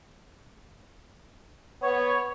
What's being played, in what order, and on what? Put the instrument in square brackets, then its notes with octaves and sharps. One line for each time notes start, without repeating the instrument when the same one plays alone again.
[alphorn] B3 [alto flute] C#5